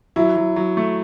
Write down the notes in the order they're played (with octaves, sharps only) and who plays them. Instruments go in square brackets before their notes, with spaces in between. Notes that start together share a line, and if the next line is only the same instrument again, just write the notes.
[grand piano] F#3 [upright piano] E4
[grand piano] F#3
F#3
A3